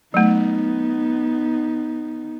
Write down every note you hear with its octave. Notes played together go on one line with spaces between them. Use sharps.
F#3 A3 B3 D#4